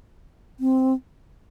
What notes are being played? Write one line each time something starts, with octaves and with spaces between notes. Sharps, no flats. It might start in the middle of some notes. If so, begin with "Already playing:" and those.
C4